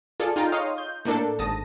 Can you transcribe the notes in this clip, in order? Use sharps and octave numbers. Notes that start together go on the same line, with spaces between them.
F4 G#4 A4 D5
D#4 F4 G5 A#5
C#5 D#5 F5 C6 D#6 F6
G6
A2 A#3 D4 A4
G#1 A5 D#6 A#6